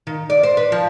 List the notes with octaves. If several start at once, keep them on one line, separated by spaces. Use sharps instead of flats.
D#3
D5
C5
B4
F3